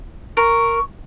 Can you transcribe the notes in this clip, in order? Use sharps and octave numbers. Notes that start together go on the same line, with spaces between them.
A#4 C#6